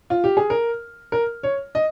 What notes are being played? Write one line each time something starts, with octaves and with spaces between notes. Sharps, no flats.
F4
G4
G#4
A#4
A#4
C#5
D#5